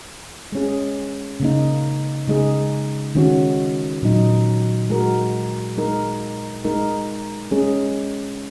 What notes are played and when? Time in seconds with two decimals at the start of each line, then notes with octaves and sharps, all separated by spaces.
0.52 G#3 C#4 G#4
1.40 C#3 A#3 D#4
2.28 C#3 G#3 D#4 G#4
3.15 D#3 G#3 C#4 F#4
4.02 A#2 F#3 D#4
4.90 G#3 F#4 A#4
5.77 G#3 D#4 A#4
6.65 G#3 D#4 A#4
7.51 G#3 C#4 G#4